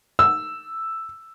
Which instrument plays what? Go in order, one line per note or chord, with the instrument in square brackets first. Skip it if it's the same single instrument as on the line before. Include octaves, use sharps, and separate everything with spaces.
[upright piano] E6